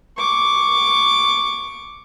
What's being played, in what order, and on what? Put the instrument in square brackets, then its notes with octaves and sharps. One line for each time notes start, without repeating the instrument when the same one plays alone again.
[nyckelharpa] C#6 D6